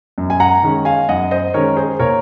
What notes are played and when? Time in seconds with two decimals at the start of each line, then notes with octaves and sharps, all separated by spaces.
0.18 F#2
0.30 G#5
0.40 F#5 A#5
0.63 D#3 G#3 C#4
0.85 F5 G#5
1.09 F#2 D#5 F#5
1.31 C5 D#5
1.54 D#3 G#3 C#4 A#4 C#5
1.76 G#4 C5
1.99 A#2 A#4 C#5